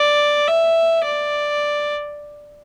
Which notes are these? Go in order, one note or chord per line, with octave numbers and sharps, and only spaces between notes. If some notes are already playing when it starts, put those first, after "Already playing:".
Already playing: D5
E5
D5